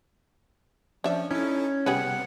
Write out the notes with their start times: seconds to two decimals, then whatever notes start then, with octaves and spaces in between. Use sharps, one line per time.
1.04 F3 C#4 D4 E5
1.31 C#4 D#4 E4 A4
1.86 C3 G3 B3 G4 G#4 B4 F#5